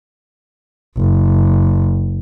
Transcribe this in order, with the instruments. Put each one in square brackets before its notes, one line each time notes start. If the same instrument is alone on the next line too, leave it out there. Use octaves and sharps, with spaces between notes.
[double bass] F#1